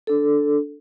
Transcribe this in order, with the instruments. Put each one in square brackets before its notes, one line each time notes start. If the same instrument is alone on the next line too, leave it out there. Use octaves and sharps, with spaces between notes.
[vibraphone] D4 A4